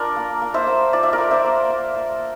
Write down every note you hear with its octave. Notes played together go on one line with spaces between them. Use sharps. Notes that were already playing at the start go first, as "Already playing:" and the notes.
Already playing: D4 F4 A#4 D5
A#3
A#3
C5 E5
A#3
F4 D5
E5
A#4 D5
F4
C5 E5
A#3
A#3
A#3